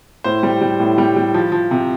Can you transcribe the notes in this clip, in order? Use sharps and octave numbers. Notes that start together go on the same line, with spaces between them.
A2 C5
G3
G3
A2
G3
G3
F3
F3
C3